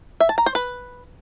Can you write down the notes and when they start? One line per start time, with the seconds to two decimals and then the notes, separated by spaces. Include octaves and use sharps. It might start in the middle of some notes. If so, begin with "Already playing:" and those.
0.20 E5
0.29 A5
0.38 A#5
0.46 C5
0.55 B4